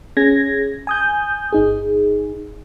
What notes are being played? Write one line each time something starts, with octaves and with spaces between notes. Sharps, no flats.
C#4 G#4 G#6 A#6
G#5 D#6 G6
G1 D#4 G#4